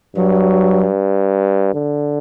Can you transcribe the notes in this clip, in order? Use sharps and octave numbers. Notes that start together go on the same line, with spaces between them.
G2 F#3
D3